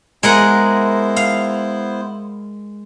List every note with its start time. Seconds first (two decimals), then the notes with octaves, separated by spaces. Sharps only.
0.23 G#3 B3 E4 A#4 C5 F#5
1.16 F5